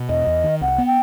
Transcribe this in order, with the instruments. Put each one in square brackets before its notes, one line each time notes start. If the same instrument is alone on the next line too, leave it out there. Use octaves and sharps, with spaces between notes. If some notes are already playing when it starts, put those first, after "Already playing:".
Already playing: [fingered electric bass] B2
[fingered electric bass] E2 [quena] D#5
[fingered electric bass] E2
D#3
[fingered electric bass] C2 [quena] F#5
[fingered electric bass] B3
[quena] G5